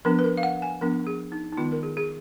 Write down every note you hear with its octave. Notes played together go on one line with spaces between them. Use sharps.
F3 B3 D4 A#4
B4
A#4
F5
F#5
G#5
F3 B3 D4 A#4
G#4
D#4
D#4
D#3 G#3 B3 F4
A#4
G#4
G#4